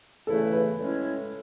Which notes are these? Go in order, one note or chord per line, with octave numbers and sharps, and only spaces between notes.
E2 C#3 E3 A3 E4 A4
B4
A2 G#3 C#4 E4